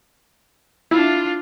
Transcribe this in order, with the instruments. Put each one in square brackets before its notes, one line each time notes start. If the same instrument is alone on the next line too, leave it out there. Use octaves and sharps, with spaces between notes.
[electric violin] D4 F4 [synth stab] E4